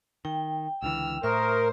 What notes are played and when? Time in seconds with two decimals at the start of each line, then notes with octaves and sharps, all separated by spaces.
0.25 D#3 G5
0.82 C#2 D3 E3 E6 F6
1.23 A2 A#4 C5 E5 C#6 D#6